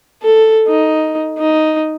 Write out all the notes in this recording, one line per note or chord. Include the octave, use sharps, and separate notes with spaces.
A4
D#4
D#4